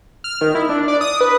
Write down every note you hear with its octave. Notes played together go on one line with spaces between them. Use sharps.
F6
D#3
E4
D4
D5
D#6
B4